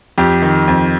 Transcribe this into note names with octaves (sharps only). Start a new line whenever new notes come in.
F2 G4
D#3
F2